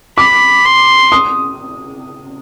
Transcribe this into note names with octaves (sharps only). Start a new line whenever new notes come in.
B5 D6
C6
D#6